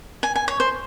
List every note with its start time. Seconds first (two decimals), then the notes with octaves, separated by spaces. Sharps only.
0.23 G#5
0.36 G#5
0.48 C#5
0.60 C5